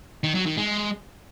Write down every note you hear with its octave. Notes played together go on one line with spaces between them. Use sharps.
D#3
F#3
D#3
G#3